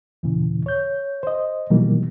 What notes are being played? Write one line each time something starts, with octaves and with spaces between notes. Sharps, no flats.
D#2 A#2 C#3 E3
C#5 G6
C5 D#5
B2 D#3 E3 F#3 G3 A#3